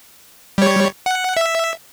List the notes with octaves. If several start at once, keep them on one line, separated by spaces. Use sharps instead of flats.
G3 C#5
F#5
E5